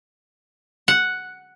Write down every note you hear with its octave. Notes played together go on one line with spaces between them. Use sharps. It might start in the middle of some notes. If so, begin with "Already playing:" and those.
F#5